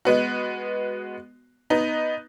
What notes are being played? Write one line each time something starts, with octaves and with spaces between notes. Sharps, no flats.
G#3 B3 F#4
B3 D#4